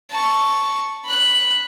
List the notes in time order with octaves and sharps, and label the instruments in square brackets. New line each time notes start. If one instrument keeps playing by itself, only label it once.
[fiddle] A5 C#6
B5 F#6